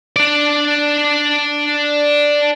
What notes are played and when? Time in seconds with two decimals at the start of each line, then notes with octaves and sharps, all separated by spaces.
0.16 D4 D5